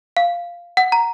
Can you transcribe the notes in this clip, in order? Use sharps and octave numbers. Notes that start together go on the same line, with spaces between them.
F5
F#5
A#5